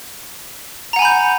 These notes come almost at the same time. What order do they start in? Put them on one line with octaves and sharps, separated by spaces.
A#5 F#5 G#5 B5 G6